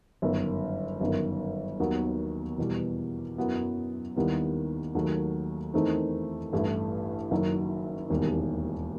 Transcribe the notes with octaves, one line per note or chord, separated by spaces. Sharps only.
G1 F#2 D#3
G1 F#2 D#3
D#2 D#3 F#3 B3
E2 B2 G3
F#2 F#3 B3 E4
D#2 D#3 G3 B3 E4
D#2 D#3 F#3 A3
E2 D#3 A3 C4 D#4
A1 G2 E3 A3 E4
F#1 F#2 D#3 F#3
E1 D#2 D#3 G3